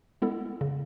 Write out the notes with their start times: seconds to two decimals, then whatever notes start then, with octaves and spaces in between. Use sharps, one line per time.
0.22 G#3 B3 E4 A4
0.61 C#3